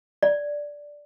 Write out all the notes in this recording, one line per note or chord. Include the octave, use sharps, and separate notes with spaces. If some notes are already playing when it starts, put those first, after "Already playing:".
D5